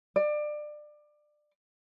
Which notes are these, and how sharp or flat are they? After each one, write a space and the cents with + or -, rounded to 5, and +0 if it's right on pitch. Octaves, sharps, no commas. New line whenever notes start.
D5 +25